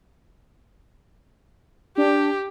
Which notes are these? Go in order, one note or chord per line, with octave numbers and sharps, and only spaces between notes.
D4 G4